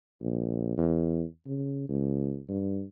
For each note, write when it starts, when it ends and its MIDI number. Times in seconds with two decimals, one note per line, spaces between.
0.21 0.77 34
0.78 1.24 40
1.47 1.85 49
1.89 2.40 37
2.49 2.84 43